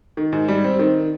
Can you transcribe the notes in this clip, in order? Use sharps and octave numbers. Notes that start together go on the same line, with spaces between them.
D#3
G#2
G3
C4
D#3